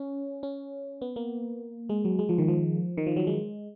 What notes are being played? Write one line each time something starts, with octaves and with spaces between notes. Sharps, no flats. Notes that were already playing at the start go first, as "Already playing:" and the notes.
Already playing: C#4
C#4
B3
A#3
G#3
F#3
G#3
F3
D#3
F3
D#3
F3
F#3
G#3